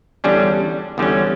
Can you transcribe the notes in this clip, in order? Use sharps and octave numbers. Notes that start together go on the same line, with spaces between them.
E2 D3 G3 C#4 D4
E2 D3 G3 C#4